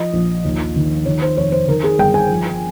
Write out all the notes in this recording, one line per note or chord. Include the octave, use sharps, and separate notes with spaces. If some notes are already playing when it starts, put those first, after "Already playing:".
Already playing: F3 D#5
A#1
D#2
D#3
D#3 C#5
C5
F1 C#5
C5
D#3 A#4
G#4
G1 G5
G#5
F3